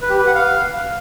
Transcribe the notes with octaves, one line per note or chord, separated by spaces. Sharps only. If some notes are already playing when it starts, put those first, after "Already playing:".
B4
G4
B4
F#5
F5